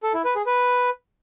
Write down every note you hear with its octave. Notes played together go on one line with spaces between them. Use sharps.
A4
E4
B4
G#4
B4